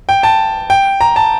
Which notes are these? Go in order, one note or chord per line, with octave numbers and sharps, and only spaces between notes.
G5
A5
G5
A#5
A5